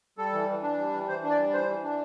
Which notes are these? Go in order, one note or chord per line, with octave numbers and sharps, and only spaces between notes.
G3 A4
E3
E3
D4
G3
E3
E3 C5
D4
D5
G3
E3 C5
E3
D4